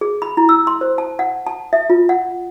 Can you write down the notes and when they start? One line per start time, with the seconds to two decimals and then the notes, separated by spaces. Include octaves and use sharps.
0.01 G#4
0.22 B5
0.37 E4
0.49 E6
0.67 C6
0.81 C5
0.98 A5
1.19 F#5
1.47 A5
1.73 E5
1.90 F4
2.09 F#5